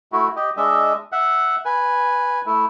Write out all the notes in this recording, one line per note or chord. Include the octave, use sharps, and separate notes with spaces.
A3 E4 F#4
G4 D#5
G#3 D4 D#5 E5
E5 F#5
B4 G#5
A3 E4